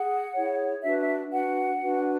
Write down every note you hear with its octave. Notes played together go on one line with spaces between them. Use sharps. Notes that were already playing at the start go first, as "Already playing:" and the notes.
Already playing: G#4 F#5
E4 G#4 C#5
D4 F#4 B4 E5
E5
D4 F#4 B4 F#5
D4 F#4 B4